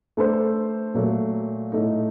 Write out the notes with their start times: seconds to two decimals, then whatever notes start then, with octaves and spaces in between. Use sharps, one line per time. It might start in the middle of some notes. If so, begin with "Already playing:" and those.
0.17 A3 D4 A4 C5
0.94 A#2 F#3 A3
1.72 A2 A3 D#4